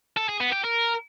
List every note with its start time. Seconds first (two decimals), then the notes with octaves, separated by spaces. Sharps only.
0.17 A4
0.29 G#4
0.41 B3
0.52 G4
0.64 A#4